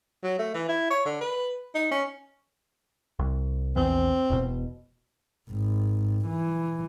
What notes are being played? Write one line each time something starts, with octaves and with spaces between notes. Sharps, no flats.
F#3
A3
E3
E4
C#5
D3
B4
D#4
C#4
C2
A#1 E2 E3 C4
E1 B2
G#1
E3